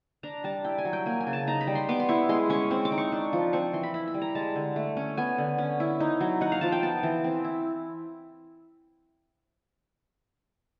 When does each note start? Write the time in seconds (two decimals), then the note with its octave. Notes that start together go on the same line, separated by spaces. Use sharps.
0.23 D4 A#5
0.44 G3 A5
0.65 E4 G5
0.78 G#5
0.85 F#3
0.93 G5
1.06 A#3 G#5
1.20 G#5
1.27 C#3
1.33 A5
1.47 D#4 A#5
1.61 B5
1.67 G3
1.75 C6
1.89 B3 D6
2.00 C6
2.09 E4 C#6
2.29 G#3 C6
2.50 C#4 C#6
2.71 C4 C#6
2.85 D6
2.92 D#4
2.98 C#6
3.12 D4
3.33 F3
3.53 C4 C#6
3.73 E3 C6
3.83 B5
3.94 E4 B5
4.08 B5
4.14 G3
4.22 A#5
4.35 G#3 A5
4.55 D3
4.76 A3
4.97 C#4
5.17 B3 G#5
5.38 D3
5.58 C#4
5.80 E4
6.00 D#4
6.21 F#3
6.41 D#4 F#5
6.52 F5
6.61 F3 A5
6.72 G5
6.82 B3 A5
7.03 E3
7.24 C4
7.44 E4